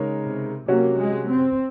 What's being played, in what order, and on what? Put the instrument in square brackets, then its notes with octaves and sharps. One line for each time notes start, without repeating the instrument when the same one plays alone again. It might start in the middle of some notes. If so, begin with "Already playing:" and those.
Already playing: [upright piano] C#3 G#3 D#4 A#4 C#5
[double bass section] C3
[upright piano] C3 F#3 C#4 F#4 [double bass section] A#3
[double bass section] G#3
C4